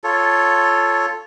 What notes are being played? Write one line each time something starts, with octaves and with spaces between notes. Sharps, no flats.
F4 A4 C#5